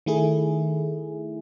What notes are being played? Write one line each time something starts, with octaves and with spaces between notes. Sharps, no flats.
D#3 A3 E4 G#4